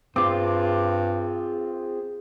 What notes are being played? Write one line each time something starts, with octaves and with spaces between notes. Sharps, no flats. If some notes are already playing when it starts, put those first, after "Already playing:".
G2 C4 F4 G#4 D6